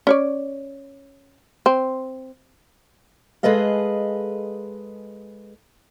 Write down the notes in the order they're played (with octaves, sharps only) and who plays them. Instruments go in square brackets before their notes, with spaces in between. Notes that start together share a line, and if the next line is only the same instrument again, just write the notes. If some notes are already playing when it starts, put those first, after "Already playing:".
[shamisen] C#4 C#5 D5
C4
[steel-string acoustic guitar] G#3 G#4 A4 B4 D#5 F5